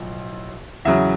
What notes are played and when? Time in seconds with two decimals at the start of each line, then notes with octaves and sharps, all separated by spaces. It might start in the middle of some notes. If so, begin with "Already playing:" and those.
Already playing: B1 A2 F3
0.85 E2 C#3 F#3 E5